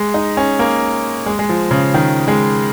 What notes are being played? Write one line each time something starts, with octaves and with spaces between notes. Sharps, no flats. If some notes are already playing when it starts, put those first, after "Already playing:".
Already playing: G#3
D#4
C#4
A#3
G#3
G#3
F3
C#3
D#3
G#3